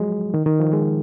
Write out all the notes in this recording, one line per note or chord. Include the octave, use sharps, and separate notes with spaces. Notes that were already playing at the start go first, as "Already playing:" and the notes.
Already playing: F3 F#3 G#3
D#3
D#3
F3
G#3